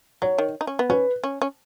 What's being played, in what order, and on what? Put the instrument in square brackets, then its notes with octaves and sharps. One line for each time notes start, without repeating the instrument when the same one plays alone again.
[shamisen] F#3 [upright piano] C#5
[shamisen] D#3
D#4
C#4
B3
[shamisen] C#4 [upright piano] B4
[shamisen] C#4
C#4